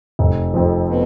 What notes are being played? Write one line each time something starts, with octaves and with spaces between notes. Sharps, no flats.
F1
F2 F3
B2